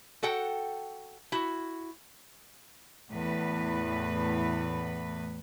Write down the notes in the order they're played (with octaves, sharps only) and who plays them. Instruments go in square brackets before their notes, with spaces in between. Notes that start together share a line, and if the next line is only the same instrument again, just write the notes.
[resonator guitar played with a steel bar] F#4 A4 F#5 G5
E4 F#4
[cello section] E2 A2 B4